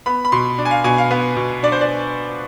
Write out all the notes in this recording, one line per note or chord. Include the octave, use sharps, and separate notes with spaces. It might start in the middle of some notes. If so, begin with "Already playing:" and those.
B3 B5
B5
B2 C6
D4
G#5
F5
B2 G#5
F5
B3
B2
D4 D5
C5
D5